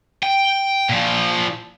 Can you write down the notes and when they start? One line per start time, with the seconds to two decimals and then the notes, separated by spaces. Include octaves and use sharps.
0.23 G5
0.89 A#2 F3